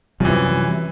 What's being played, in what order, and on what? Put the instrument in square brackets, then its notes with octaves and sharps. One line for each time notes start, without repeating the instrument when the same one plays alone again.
[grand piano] F#2 E3 [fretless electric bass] C3 F3 G3